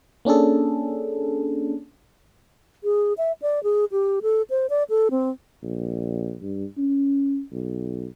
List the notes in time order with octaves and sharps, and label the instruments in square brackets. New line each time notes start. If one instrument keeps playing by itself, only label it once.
[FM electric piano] A#3 C#4 D4 G#4 A4
[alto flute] G#4
E5
D5
G#4
G4
A4
C5
D5
A4
C4
[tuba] A#1
G2
C#4
B1